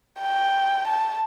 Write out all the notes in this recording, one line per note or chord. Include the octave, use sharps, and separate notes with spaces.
G5
A5